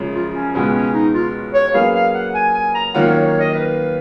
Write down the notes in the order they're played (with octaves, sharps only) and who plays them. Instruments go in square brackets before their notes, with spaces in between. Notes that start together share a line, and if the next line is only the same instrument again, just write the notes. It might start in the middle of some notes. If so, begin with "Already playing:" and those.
Already playing: [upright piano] F#2 C#3 F3 G#3
[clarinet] F4
C#4
[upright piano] C#2 B2 G#3 B3 F#4 [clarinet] C#4
[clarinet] C#4
D#4
F4
C#5
[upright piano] F#3 A#3 C#4 G#4 B4 [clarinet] F5
[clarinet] F5
F#5
G#5
G#5
A#5
[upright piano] D#3 F#3 A#3 C#4 F4 [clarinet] F#5
[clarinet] C#5
C#5
D#5
B4